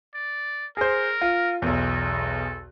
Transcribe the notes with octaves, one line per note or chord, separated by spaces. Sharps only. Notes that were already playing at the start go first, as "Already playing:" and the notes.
D5
G#4 A#4 C5
F4
B1 E2 A4